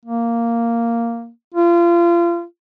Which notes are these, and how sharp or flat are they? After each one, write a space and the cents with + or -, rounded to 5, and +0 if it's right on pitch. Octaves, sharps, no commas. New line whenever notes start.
A#3 -5
F4 -30